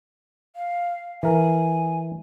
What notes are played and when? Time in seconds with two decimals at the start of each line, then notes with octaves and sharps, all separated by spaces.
0.56 F5
1.23 E3 A#4 G#5